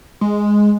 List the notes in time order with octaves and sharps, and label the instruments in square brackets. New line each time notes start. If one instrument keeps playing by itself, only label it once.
[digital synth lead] G#3